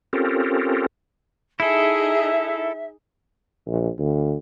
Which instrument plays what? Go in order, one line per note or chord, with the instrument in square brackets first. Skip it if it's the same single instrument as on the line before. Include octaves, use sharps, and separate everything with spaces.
[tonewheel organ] C4 C#4 F4 G4 A4 A#4
[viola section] D#4 G#4 [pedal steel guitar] E4 A4 [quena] E5
[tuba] A#1
D2